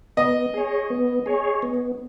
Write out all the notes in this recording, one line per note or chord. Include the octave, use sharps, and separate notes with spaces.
B3 D#5
G#4 C#5
B3
G#4 C#5
B3